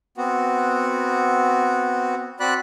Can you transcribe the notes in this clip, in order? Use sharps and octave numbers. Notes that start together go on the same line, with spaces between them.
B3 C4 F#4
C4 F#4 D5 B5 F#6